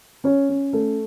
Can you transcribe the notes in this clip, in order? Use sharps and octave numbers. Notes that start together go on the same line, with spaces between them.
C#4 C#5
C#4
A3